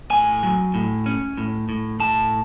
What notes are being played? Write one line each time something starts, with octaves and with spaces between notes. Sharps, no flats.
A2 G#5
F#3
A2
C#4
A2
A2
A2 A5